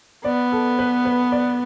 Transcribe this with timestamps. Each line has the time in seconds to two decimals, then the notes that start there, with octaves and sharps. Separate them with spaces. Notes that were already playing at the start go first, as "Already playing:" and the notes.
0.24 B3 D5
0.52 A4
0.79 B4
1.05 B4
1.32 D5